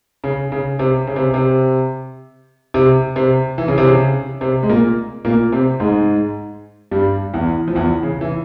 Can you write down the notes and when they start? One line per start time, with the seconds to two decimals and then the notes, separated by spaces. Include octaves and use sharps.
0.24 C#3
0.52 C#3
0.79 C3
1.07 C#3
1.16 C3
1.34 C3
2.74 C3
3.16 C3
3.58 E3
3.68 C#3
3.78 C3
3.87 C#3
4.41 C3
4.63 G#3
4.69 A#2 A#3
5.25 A#2 A#3
5.52 C3 C4
5.80 G#2 G#3
6.91 G2 G3
7.33 E2 E3
7.68 F3
7.75 E2 E3
8.03 C#3
8.21 E3